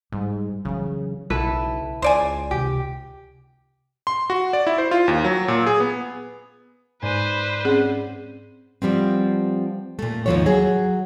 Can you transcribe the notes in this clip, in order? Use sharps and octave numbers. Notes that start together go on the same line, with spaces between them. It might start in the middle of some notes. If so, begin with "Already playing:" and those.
G#2 G3
C#3 E3 F#3
B1 C#3 E4 A4 B4
C#2 C5 D5 G#5
C3 D#3 G4
C6
F#4
D5
E4
C5
F4
D#2
F#3
A#2
G#4
B3
G#2 B4 C5 D5 G#5 D#7
C4 C#4 G#4 F#5
F3 G3 B3 C4
A#2 A3
D#2 G#2 C3 F3 B3 C#5
F#3 G#4